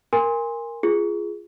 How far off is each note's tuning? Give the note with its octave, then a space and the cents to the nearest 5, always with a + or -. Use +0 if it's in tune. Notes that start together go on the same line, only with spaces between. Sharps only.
A#4 +0 G#5 -20 C6 +5
F4 -20 G#4 +0